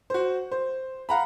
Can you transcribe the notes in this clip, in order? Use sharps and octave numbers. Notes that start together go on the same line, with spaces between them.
F#4 C5
C5
F5 F#5 A#5 B5